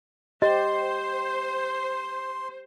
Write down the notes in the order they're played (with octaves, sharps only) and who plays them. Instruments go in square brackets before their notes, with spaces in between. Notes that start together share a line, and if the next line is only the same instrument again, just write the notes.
[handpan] G4 [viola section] C5 [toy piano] D#5 [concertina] C6